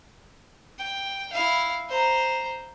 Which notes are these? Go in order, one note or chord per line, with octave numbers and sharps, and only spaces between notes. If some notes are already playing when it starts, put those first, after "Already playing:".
G5
E4 F5
C5 A#5